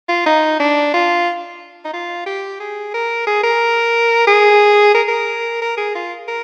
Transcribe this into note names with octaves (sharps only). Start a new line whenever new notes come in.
F4
D#4
D4
F4
D#4
F4
G4
G#4
A#4
G#4
A#4
G#4
A#4
A#4
A#4
G#4
F4
A#4